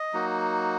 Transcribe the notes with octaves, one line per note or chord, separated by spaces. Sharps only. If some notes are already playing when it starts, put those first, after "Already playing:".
Already playing: D#5
F#3 A#3 D#4 F#4